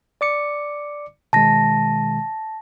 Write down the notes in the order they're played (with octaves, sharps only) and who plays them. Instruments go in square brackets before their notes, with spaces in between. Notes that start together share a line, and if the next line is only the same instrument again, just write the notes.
[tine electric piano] D5 D6 C#7
[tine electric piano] B2 D#3 G#3 [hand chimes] A5 A#6